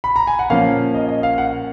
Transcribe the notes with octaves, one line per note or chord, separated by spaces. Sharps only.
B5
A#5
G#5
F#5
A#2 F3 A#3 C#4 F5
D#5
D#5
F5
F#5